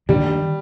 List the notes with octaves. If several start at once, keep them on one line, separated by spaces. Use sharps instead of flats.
D#3 G3 A#3 D4